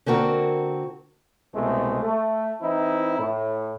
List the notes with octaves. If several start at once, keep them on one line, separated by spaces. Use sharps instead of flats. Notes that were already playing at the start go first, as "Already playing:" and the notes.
D3 A#3 C4 F#4 A#4
C2 B2 G#3 A3
A3
E3 C4 D#4 E4
A2